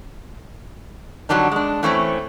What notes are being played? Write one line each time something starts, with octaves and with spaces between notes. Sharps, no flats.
D3 F#3 G3 D4 D#4
G#3 D4
E3 A3 C4 C#4